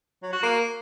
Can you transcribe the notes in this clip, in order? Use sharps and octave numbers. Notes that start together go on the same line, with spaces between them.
F#3
F#4
A#3